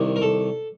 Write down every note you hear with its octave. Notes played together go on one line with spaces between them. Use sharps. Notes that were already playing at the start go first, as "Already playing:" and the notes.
Already playing: C2 C3 D#3
A#4
A4